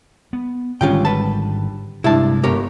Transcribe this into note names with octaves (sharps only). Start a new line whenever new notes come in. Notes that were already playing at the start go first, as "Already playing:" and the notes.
B3
G#2 D3 D#3 G3 G#3 C#4 F4 G5
B4 A5
G2 C3 G#3 A3 D4 E4 A5
G1 G4 A#4 C#5